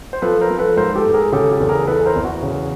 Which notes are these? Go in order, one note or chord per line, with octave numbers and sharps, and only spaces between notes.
C5
F3 A4 B4
A#4 C5
F3
A4 B4
G#2 A#4 C5
G4 A4
G#2
G#4 A#4
C#3 G4 A4
G4 A4
E2
G#4 A#4
E3 A4 B4
A#4 C5
E2
F#4
C#3